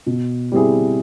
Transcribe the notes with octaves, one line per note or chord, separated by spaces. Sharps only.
B2
G3 C4 E4 G#4